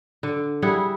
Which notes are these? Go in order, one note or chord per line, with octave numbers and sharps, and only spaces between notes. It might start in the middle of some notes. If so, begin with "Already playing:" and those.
D3
G3 E4 G#4 F#5